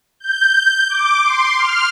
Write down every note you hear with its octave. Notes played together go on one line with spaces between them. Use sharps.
G6
D6
C6
F6